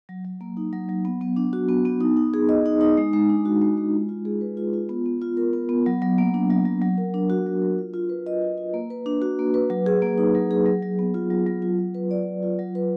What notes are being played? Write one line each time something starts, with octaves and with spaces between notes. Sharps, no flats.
F#3
F#3
A#3
D#4
F#3
F#3
B3
B3
D4
F#4
B3
B3
D#4
D#4
G#4
D#5
D#4
D#4
G#3
G#3
D4
F#4
G#3
G#3
F4
F4
G#4
B4
F4
F4
B3
B3
F4
A#4
B3
B3
F#3
F#3
A#3
D4
F#3
F#3
F#3
A#4
D4
F#4
F#3
A#4
F4
F4
B4
D#5
F4
F4
A#3
B4
D4
F#4
A#3
B4
F#3
G#4
A#3
D#4
F#3
G#4
F#3
F#3
B3
F4
F#3
F#3
F4
F4
B4
D5
F4
F4
F#3
B4